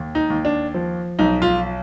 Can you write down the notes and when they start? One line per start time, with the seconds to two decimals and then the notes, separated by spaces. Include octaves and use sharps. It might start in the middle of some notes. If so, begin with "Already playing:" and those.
Already playing: D#2
0.15 D#4
0.30 D#2
0.45 D4
0.74 F3
1.19 B1 D#4
1.42 F4